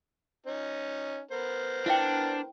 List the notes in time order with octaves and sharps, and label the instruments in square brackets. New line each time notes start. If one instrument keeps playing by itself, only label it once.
[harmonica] C#4 D#4
B3 A#4 C5
[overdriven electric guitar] D4 [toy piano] E4 E5 G5